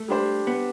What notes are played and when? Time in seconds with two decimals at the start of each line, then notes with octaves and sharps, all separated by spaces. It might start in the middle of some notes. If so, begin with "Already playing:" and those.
Already playing: A3
0.08 G3 D4 G4 C5
0.47 B3